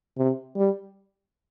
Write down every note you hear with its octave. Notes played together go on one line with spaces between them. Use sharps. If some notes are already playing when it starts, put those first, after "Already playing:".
C3
G3